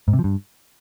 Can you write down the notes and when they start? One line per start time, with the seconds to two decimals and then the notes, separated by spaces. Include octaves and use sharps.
0.08 G#2
0.13 C3
0.19 F3
0.24 G2